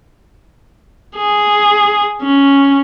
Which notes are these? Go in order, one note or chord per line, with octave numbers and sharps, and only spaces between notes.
G#4
C#4